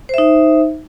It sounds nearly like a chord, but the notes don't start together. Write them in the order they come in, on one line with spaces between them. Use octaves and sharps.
C5 E5 D#4